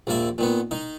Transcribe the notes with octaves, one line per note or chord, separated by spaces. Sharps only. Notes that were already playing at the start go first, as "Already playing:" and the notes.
A#1 D#2 A#3 D5 E5
A#2 D#3 B3
D#3 D#4